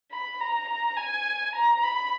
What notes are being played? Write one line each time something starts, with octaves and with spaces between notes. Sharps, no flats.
B5
A#5
A#5
G#5
A#5
B5